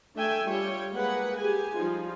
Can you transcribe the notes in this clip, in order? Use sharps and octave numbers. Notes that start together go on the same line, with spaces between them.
A3 D4 E5 G5 G#5
G3 F4 G4 C#5 G5
G#3 A#3 G#4 B4 F#5
G4 G#4 G#5
F3 G3 D#4 F4